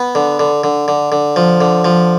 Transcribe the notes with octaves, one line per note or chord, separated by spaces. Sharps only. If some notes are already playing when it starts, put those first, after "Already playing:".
Already playing: B3
D3
D3
D3
D3
D3
F3
D3
F3